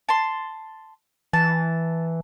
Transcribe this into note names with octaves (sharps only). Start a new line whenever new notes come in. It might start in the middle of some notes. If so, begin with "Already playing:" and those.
A5 C6
E3 A5